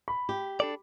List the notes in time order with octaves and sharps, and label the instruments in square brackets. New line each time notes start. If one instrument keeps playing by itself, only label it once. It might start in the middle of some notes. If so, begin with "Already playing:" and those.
[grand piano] B5
[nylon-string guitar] G4
[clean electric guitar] D4 A4 D5